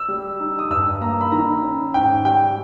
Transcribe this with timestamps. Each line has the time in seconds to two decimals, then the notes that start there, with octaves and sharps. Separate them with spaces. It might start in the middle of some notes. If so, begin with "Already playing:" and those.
Already playing: E6
0.08 G3
0.40 D#4
0.59 D#6
0.70 G2 E6
1.01 A#3 A#5
1.21 B5
1.32 D#3 A#5
1.63 C#4
1.94 G#2 G5
2.25 G3 G5